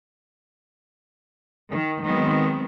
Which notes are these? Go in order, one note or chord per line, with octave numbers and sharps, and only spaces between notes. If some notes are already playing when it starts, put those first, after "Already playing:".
D#3
D#3 F#3 G#3 B3 C4